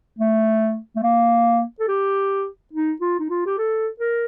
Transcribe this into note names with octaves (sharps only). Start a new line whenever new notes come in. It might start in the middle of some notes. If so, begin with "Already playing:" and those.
A3
A3
A#3
A4
G4
D#4
F4
D#4
F4
G4
A4
A#4